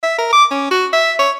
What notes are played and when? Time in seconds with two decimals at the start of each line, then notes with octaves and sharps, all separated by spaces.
0.03 E5
0.18 A#4
0.33 D6
0.51 C#4
0.71 F#4
0.93 E5
1.19 C#5